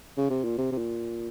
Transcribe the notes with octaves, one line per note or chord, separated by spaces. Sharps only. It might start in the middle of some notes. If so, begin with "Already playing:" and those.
C#3
C3
A#2
C3
C3
A#2